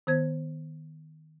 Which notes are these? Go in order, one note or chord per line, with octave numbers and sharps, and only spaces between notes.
D#3 B3 C5 G#6